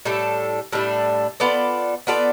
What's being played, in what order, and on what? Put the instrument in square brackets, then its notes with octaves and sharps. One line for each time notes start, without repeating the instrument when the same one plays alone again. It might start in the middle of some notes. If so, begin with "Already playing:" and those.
[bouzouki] A2 G3 D4 A4
A2 G3 D4 A4
B3 F4 A4 D5
B3 F4 A4 D5